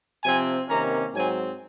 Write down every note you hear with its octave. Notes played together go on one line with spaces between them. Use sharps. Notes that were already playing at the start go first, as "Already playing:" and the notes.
C3 F3 C4 G#5
C3 D#3 A#3 C#4 A#5
G#2 F#3 C4 G#5